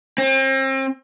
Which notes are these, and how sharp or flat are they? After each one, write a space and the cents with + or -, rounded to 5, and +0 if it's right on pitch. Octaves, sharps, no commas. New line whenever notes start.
C4 +35